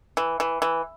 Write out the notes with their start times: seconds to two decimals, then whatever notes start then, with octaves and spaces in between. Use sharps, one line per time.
0.17 E3
0.40 E3
0.62 E3